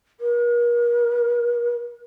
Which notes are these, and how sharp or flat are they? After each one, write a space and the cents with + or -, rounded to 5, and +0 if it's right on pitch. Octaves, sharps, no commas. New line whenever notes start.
A#4 +40